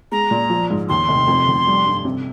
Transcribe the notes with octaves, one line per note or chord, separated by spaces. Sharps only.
G#3 A#5
A#2
F3
G#2
D#2 C6
F1
F2
F1
G3
G2
C3